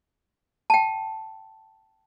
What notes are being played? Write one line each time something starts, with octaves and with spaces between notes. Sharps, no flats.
G5 A5